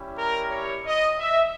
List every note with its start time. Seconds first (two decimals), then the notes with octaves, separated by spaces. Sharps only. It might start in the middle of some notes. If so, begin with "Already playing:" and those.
Already playing: G3 C#4 E4 G4
0.18 A#4
0.52 C#5
0.86 D#5
1.19 E5